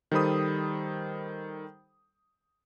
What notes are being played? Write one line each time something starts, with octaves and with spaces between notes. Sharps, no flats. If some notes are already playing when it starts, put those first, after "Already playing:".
D#3 G3 A4 C5 B5 D#6